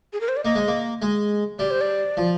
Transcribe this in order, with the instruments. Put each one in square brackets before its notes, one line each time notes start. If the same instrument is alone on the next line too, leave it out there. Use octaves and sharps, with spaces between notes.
[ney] G#4
A#4
C5
D5
[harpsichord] A#3 [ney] D#5
[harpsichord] G#3
A#3
G#3
[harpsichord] G3 [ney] D5
[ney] C5
D5
[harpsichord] F3